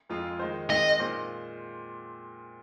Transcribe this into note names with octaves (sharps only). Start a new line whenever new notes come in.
F2 F3 G#3 F4 G#4
D#3 G#3 D#4 C5
D#3 G#3 C4 D#4 D#5
A#2 G#3 F4 C5